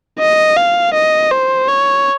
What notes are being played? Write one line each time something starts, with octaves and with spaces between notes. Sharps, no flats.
D#5
F5
D#5
C5
C#5